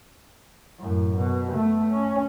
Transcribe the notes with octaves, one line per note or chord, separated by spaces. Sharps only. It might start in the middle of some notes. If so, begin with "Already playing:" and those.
F#2 A2
B2
A3 B3
C#4